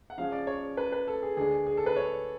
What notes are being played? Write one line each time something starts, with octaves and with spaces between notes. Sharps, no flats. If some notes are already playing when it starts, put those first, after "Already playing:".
F#5
C#3 F3 G#3 C#4 F5
D5
C#5
B4
B4
A4
G#4
D2 D3 G#3 D4 G#4
G#4
A4
B4
C#5